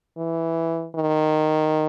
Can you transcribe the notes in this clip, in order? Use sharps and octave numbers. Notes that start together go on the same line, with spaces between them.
E3
D#3